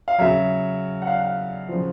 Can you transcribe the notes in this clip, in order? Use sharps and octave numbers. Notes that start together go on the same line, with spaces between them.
F5
C#3 F#3 E5
F#5
F5
F#5
C#3 F3